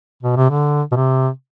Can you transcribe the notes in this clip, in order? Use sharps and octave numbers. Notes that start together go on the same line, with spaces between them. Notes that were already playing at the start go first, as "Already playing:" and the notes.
B2
C3
D3
B2
C3